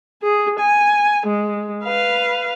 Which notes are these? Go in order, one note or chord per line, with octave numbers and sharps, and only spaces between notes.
G#4
G#5
G#3
B4 F5